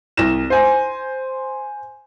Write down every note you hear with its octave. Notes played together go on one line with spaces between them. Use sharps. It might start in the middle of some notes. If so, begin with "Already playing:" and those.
C2 A#6 E7
C5 G#5